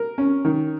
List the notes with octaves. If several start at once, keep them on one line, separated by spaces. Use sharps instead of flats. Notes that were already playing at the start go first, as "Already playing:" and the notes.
Already playing: A#4
C#4
D#3